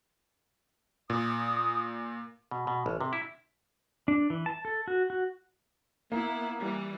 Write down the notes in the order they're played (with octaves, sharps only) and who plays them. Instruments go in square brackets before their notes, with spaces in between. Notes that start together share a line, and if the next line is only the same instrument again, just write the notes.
[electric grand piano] A#2 [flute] D#6
[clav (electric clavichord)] B2
B2
A1
C3
E4
[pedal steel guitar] D4
E3
A5
A4
F#4
F#4
[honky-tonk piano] A#3 [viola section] B3 E4
[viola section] E3 G3